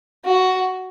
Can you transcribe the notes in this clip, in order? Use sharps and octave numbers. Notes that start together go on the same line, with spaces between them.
F#4